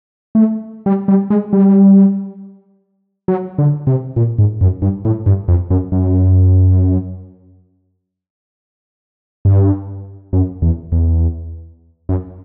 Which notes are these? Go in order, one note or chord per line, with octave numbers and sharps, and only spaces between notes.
A3
G3
G3
G#3
G3
F#3
D3
C3
A#2
G#2
F#2
G2
A2
G2
F2
F#2
F#2
G2
F#2
E2
E2
F#2